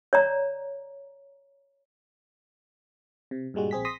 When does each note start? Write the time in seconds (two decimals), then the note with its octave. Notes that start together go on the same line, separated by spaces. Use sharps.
0.13 C#5 D5 A#5
3.31 C3
3.54 G2 A#2 G3 G#3 F#4
3.71 A#1 C4 G#4 B6
3.85 C6 D#6 A#6 B6